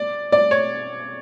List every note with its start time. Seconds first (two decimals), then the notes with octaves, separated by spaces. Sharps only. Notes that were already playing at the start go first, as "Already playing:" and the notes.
Already playing: D5
0.32 D5
0.51 C#5